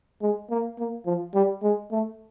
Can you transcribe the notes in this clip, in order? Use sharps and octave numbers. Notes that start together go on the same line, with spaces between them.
G#3
A#3
A#3
F3
G3
G#3
A3